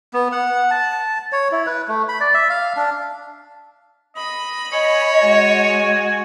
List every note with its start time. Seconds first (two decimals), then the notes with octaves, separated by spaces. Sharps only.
0.14 B3
0.32 F#5
0.71 A5
1.32 C#5
1.52 E4
1.66 B4
1.88 A3
2.08 B5
2.21 D5
2.34 E5
2.50 F5
2.76 D4
4.16 D#5 B5
4.73 C#5 D#5 G#5
5.22 G#3 F#4 G#5